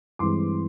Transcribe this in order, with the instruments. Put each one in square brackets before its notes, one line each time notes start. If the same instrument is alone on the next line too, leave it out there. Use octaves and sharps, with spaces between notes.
[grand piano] G2 E3 G#3 C4 C6 D6